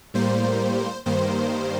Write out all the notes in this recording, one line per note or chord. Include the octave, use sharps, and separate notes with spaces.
A2 G3 A#3 C5
G2 D#3 G3 A#3 C5